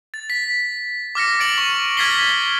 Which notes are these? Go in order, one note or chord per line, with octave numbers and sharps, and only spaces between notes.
A6
B6
D6 F6 A#6 C#7
A6 D7 F#7
C#6
F6 G#6 A6 B6 C7 G7